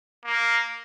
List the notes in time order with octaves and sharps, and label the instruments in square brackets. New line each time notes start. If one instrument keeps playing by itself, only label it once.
[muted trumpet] A#3